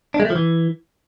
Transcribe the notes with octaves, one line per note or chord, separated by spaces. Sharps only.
D4
G#3
A3
F3
E3